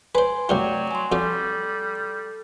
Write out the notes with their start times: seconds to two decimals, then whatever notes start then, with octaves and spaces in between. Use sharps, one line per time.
0.15 B4 C5 G#5 C6
0.49 C2 F#2 F#3 A3 F4 D5 G5
0.91 G#5 C6
1.12 F2 G3 F#4 A4 D5